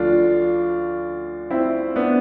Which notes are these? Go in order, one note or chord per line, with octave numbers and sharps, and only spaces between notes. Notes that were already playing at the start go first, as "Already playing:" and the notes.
Already playing: D2 D3 F3 D4 F4
C4 E4
B3 D4